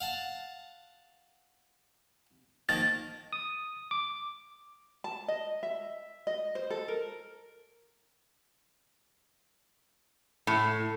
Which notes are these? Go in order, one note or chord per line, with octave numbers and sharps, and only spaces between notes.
F5 F#5 A5
D#3 F3 A#3 A6
D#6
D6
A5
D#5
E5
D#5
C5
A4
A#4
A2